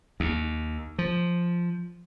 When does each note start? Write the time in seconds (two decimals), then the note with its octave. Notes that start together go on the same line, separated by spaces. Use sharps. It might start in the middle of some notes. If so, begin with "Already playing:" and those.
0.20 D#2
0.99 F3